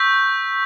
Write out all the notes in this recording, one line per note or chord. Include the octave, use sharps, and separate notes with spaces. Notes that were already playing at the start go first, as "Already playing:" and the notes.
Already playing: C#6 E6 G6 B6